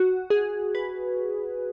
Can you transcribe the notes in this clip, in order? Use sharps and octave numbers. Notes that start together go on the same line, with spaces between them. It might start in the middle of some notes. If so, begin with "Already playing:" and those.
Already playing: F#4
G#4
B4